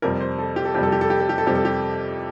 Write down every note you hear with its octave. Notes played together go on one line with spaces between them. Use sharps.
F2 C3 G3 A#4
C5
A4
G4
A4
F2 C3 G3 G4
A4
G4
A4
G4
A4
G4
A4
F2 C3 G3 G4
A4
G4